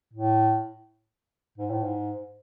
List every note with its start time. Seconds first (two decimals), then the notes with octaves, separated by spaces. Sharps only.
0.13 A2
1.58 G#2
1.70 A2
1.83 G#2